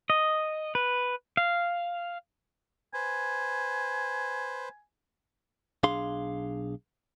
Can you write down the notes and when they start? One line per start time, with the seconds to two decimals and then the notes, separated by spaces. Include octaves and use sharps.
0.10 D#5
0.75 B4
1.37 F5
2.94 B4 C5 G#5
5.84 B1 D4 G#4 F5 C6